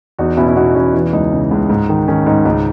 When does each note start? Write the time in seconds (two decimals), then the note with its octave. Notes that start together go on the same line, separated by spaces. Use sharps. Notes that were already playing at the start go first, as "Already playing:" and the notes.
0.19 E2 D#4 F#4
0.37 B2 C#4 E4
0.48 E4
0.56 B2 D#4 F#4
0.75 E2 C#4 E4
0.94 E3
1.13 C#2 D#4
1.32 C#3
1.51 C#2
1.70 G#2
1.89 D#3
2.08 D#3 C#4
2.26 G#2 D#4
2.45 C#2 D#4